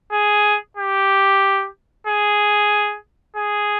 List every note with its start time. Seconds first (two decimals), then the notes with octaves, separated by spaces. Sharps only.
0.13 G#4
0.77 G4
2.07 G#4
3.36 G#4